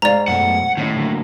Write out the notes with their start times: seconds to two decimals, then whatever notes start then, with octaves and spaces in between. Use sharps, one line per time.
0.02 G#2 D5 F5 A#5
0.28 F#2 B2 A3 F#5
0.77 A2 D#3 C#4 D#4
0.97 D3 F#3 A#3